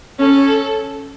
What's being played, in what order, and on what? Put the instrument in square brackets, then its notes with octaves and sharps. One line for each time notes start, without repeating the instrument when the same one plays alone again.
[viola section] C#4 [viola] A4